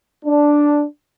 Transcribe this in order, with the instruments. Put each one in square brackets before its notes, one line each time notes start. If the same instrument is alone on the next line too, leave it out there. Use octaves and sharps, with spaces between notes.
[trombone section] D4